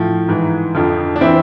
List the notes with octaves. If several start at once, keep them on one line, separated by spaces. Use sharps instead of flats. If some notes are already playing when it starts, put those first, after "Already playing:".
Already playing: A2 F3
G#2 E3
F2 D3 F3
D4
E3 C4 E4